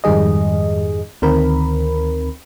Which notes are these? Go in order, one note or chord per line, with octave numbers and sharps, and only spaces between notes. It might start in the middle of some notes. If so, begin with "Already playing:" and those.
F2 G#2 D#3 G3 G#4 D#5
D2 D#3 C4 A#4 B5